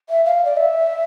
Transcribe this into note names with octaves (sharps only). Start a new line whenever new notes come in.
E5
F5
D5
E5